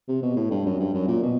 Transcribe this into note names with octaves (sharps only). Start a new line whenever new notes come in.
C3
B2
A2
G2
F#2
G2
F#2
A#2
B2